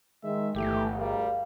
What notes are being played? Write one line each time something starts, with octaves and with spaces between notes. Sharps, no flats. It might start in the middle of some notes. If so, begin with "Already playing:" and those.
D#3 G#3 E5
G1 E3 A3 G4
D2 G3 G#4 A#4 F5